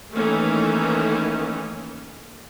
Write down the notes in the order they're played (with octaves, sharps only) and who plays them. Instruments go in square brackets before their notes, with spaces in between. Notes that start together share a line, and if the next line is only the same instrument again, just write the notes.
[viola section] D#3 E3 A3 A#3 C#4